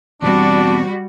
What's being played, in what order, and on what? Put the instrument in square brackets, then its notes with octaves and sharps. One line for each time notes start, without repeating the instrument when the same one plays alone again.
[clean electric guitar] E2 B2 C4 [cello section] G3 F#4 [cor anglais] D4